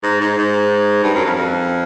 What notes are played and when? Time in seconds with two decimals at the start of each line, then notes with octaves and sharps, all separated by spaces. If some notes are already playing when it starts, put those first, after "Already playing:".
0.03 G#2
0.20 G#2
0.37 G#2
1.03 G2
1.15 F#2
1.25 F2
1.36 F2